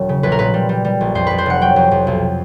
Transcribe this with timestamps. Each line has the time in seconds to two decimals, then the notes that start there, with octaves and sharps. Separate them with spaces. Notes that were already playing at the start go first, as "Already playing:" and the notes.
Already playing: E1 F#3
0.09 C#3
0.23 A#1 B4
0.32 A#4
0.39 A#2 B4
0.54 G3
0.69 G3
0.85 G3
1.01 A#1
1.15 F2 C5
1.27 F2 B4
1.38 C5
1.46 F1 F#5
1.61 F#3 G5
1.76 F2
1.91 F2
2.07 B1